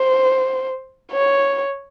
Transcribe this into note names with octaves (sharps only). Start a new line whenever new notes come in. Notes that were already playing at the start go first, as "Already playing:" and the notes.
Already playing: C5
C#5